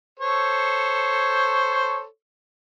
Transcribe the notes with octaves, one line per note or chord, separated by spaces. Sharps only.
A4 C5 C#5